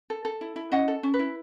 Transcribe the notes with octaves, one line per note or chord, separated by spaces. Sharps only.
A4
A4
E4
E4
C#4 D#5 F#5
A4
C#4
B4
E4